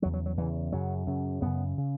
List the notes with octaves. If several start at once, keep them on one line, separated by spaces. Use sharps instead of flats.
E2 C#3 F#3
F#3
F#3
E2 C#3 E3
F#2 C#3 F#3
F#2 C#3
F#2 C#3 B3
C#3